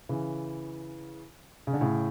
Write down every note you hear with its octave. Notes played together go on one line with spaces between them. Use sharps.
C#3 E3
C#3
D3
A2 C#3